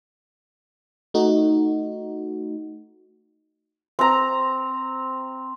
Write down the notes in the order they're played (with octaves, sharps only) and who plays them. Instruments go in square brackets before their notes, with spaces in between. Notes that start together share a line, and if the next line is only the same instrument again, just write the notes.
[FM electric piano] A3 D#4 F#4
[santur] C4 A#5